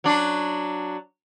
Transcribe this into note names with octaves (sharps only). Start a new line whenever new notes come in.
F#3 D4